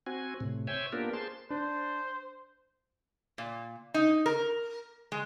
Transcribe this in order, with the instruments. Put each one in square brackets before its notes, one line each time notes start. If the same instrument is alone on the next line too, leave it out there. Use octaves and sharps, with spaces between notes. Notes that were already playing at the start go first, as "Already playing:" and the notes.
[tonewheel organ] C4 F#4 G#5
A2 C3
C5 C#5 E5 G5 G#5
A#3 B3 D4 F4 G4 A#4
G#4 C5 A5 C6
[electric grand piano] D4 [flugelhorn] C5
[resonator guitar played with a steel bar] A#2
D#4
A#4
G#3